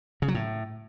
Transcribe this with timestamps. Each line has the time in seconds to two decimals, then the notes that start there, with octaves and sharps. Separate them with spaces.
0.22 C#3
0.28 F#3
0.35 A2